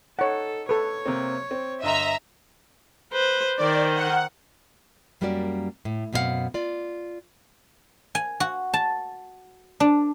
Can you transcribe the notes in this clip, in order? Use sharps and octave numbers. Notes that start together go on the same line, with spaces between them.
D#4 A4 C#5 F#5
A4 B4 C#5
C3 A#3 C4
C4
G1 D#5 E5 A#5 C6
B4 C5
D#3 C5 D5
F#5
F#2 G3 A#3 C#4 F#4 D5
A2
F#2 B2 C4 E4 F5 F#5
F4 D5
G#5
F#4
A5
D4